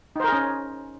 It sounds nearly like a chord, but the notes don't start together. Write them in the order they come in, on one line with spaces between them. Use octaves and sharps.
D#4 C5 A#4 G#4 C#4